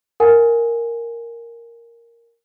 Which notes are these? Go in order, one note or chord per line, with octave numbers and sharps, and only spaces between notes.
A#4 F#5 G#5